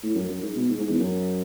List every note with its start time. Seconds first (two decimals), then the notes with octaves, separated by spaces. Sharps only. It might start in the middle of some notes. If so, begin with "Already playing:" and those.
0.03 A2
0.15 F#2
0.29 F#2
0.42 G#2
0.56 B2
0.69 G#2
0.79 G#2
0.89 E2
0.99 F#2